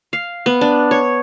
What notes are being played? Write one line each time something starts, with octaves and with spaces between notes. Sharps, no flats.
F5
B3
D4
C#5